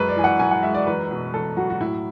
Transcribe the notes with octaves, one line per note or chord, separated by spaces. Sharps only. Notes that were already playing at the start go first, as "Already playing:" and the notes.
Already playing: F#2 G#3 B4
D5
E3 G#5
F#5
F#2 G#5
F#5
G#3 E5
D5
E2 B4
B2
E2 A4
F#3 F#4
F#4
A2 E4